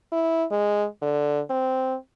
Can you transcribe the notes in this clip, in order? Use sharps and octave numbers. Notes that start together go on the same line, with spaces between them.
E4
G#3
D3
C4